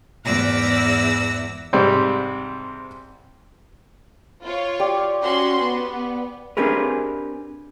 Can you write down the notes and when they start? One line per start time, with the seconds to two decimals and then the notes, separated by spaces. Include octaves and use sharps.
0.24 E2 G#2 D5 F#5 E6 A#6
1.73 G#2 C3 G3 C4
4.43 F4 C#5
4.80 G4 D5
5.22 C#4 F#4 C6
5.61 B3
6.57 C4 D4 G4 G#4 A#4 B4